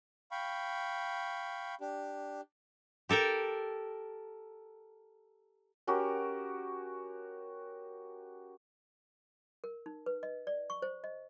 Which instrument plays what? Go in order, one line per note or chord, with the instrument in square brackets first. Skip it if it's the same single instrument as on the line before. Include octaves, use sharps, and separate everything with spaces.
[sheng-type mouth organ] F5 G5 B5 C#6
D4 G4
[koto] G4 A4 A#4 G5
[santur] C#4 F#4 G4 A#4
[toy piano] A#4
D#4
B4
D#5
D5
C#6
C5
D#5